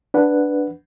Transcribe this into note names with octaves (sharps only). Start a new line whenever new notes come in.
D4 B4 F#5